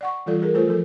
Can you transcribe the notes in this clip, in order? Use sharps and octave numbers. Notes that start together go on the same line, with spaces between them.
D5 F#5 C#6
E3 G3 F4 A4 D5
G#4 A#4
A3 F4 A4 C5
F3 A4